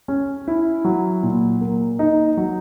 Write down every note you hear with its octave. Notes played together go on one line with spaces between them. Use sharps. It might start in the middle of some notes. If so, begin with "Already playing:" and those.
C#4
E4
F#3
A#2
A#3
D#4
F#3